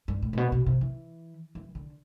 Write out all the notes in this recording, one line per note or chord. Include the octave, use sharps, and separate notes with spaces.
G2
A2
A2
B2
B2
C3
E3
E3
D3